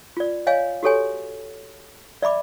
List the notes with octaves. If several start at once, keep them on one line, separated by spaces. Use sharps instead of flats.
F4 D5
C#5 D#5 F5 G#5
F#4 G4 A4 C#5 G#5
D5 E5 B5 D6